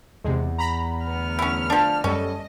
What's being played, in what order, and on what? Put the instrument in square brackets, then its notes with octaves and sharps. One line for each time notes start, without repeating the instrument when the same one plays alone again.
[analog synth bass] E2 [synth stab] C3 G#3
[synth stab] A#5 B5
[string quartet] D2 B3 F6
[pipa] C#4 E4
F3 D4
[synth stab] F#2 G3 A4 [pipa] C#4 [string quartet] D#5